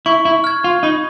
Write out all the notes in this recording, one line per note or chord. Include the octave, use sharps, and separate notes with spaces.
E4 C#6
E4
F6 G#6
F4
D#4 B5